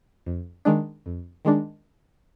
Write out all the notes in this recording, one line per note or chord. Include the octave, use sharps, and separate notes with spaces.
F2
D#3 G#3 D4
F2
D#3 G#3 D4